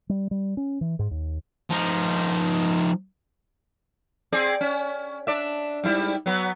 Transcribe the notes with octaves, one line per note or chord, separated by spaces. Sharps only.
G3
G3
C#4
E3
G#2
D#2
F3 D#4
C4 G#4 D5
C#4
D4 D5 E5
G#2 G3 E4
F#3 B3